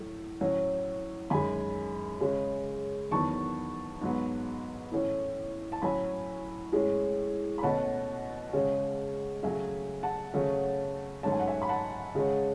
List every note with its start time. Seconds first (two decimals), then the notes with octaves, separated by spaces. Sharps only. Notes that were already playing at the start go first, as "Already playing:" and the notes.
Already playing: A2 F#3 A3
0.41 A2 F#3 C#4
1.30 F#2 D#3 G#3 G#5 B5
2.21 C#3 G#3 C#4
3.11 E2 D#3 F#3 B3 A5 C#6
4.01 G#2 F#3 B3
4.91 A2 E3 A3 C#4
5.72 A5
5.82 A2 F#3 C#4 G#5 B5
6.72 A2 G#3 C#4
7.58 B5
7.62 B2 A3 C#4 F#5 A5
8.53 C#3 G#3 C#4
9.43 C#3 F#3 A3 E5 G#5
10.03 F#5 A5
10.34 C#3 F#3 A3 C#4
11.23 G#2 F#3 A3 C#4 A5
11.32 G#5
11.40 F#5
11.47 E5 G#5
11.62 B5
11.69 F#5 A5
12.15 C#3 G#3 C#4